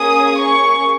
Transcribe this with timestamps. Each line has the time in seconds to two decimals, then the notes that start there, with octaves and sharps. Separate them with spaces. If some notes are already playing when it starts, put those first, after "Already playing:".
Already playing: A#3 C#4 G#4 D#6
0.40 C#6